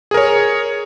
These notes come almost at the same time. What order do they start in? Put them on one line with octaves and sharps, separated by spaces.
G#4 A#4 C#5